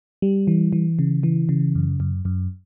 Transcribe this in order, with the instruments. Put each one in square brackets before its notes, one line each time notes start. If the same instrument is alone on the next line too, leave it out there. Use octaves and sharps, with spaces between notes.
[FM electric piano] G3
E3
E3
C#3
E3
C#3
F#2
F#2
F#2